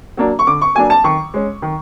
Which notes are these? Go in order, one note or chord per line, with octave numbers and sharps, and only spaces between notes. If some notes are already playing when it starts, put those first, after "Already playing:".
F#3 A#3 D4
C#6
D3 D6
C#6
F#3 A#3 D4 G#5
A5
D#3 C#6
G#3 C#4
D#3